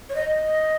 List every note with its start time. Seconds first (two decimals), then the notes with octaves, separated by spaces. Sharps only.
0.09 C#5
0.15 D#5